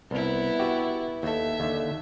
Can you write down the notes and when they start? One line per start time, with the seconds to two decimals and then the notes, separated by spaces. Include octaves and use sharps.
0.11 C2 B3 E4
0.60 F#4 G4 E5
1.23 D#2 A4 E5
1.60 D#2 D3